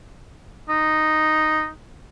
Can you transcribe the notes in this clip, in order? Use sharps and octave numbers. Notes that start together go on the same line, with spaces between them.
D#4